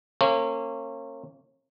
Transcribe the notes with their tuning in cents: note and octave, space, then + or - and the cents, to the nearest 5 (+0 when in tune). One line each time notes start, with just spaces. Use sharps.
A#3 -35 C#4 -35